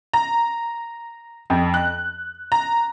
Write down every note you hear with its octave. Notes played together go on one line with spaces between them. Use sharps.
A#5
F2
F#6
A#5